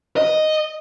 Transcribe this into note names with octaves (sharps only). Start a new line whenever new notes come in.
D#5